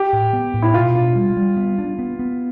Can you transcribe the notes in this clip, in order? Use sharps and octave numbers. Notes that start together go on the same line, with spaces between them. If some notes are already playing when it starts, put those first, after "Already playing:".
Already playing: G4
A2
B3
A2
E4
B2 F4
D4
G3
G3
B3
D4
B3
B3